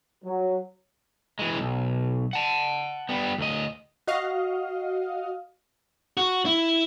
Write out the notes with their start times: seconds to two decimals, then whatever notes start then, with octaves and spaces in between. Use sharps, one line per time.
0.25 F#3
1.39 E3 G#3
1.58 B1
2.33 F#5 A5
3.09 G3 B3
3.38 D2 D#5
4.07 F#4 D#5 F5
6.17 F#4
6.46 E4